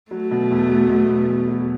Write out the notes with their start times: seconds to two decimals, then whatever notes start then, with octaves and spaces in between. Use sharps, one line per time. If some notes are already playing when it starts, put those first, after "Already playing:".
0.11 F#3 A3
0.31 B2
0.51 E2
0.69 F#3
0.89 B2
1.09 B3
1.29 E2
1.48 F#3